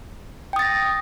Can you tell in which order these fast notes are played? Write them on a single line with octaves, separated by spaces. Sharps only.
G5 D#6 A6 A#6